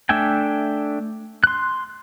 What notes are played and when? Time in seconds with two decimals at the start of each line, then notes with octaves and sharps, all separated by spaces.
0.09 A3 D4 E5 G5 G#5
1.44 C6 F#6